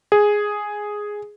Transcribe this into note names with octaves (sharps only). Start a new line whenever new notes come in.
G#4